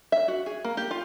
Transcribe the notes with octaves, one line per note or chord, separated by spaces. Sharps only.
E5
F#4
G#4
A#3
G4
F4